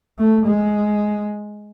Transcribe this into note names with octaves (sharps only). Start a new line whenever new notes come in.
A3
G#3